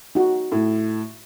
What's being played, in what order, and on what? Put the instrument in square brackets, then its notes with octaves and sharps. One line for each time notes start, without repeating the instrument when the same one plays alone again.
[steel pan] D#4 F#4
[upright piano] A2